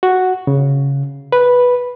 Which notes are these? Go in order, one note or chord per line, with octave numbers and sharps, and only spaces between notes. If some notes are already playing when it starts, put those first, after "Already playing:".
F#4
C#3
B4